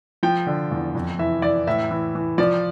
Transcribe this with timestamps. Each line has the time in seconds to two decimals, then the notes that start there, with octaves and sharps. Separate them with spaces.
0.23 F3 G5
0.47 D3
0.71 E2
0.95 F2
1.19 E3 E5
1.42 E3 D5
1.67 A2 E5
1.91 E3
2.15 E3
2.38 F3 D5